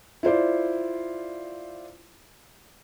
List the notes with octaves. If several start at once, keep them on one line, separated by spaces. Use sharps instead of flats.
E4 F4 C5 D5